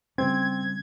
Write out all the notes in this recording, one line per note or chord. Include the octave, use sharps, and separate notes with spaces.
C#3 G3 C4 C#4 G#6